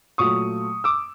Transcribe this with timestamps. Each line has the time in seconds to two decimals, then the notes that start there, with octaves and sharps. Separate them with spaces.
0.18 A#2 F#3 A3 C#6 D#6
0.84 D6 E6